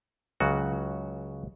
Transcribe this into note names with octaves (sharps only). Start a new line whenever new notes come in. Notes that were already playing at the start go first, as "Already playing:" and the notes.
C#2 C#3 F#3 F#4